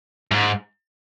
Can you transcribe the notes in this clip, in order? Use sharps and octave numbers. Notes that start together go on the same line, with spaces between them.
G#2